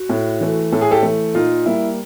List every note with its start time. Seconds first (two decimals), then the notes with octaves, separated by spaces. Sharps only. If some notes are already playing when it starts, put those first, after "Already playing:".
Already playing: F#4
0.09 A2
0.41 E3 A3
0.72 A2 A4
0.81 G#4
0.91 G4 A4
1.03 E3 A3
1.34 A#2 D#4 F4
1.66 G3 A#3 E4